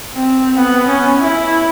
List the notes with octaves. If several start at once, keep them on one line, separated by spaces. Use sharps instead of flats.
C4
B3
C#4
E4